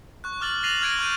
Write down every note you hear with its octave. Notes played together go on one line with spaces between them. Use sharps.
C#6 F#6
C#6 D6 F6 A6 F#7
A6 A#6 C7 D#7 F7 F#7
F6 F#6 G#6 A#6 D7 D#7
C#6 F6 G6 D#7